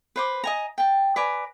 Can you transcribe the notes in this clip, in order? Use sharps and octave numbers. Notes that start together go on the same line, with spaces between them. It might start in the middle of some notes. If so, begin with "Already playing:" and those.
B4 C5 D6
D#5 G#5 A#5
G5 A5
B4 D5 G#5 A#5